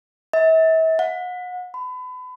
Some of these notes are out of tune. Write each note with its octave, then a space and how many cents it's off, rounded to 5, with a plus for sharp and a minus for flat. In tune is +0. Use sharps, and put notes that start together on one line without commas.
E5 -40
F#5 -35
B5 +30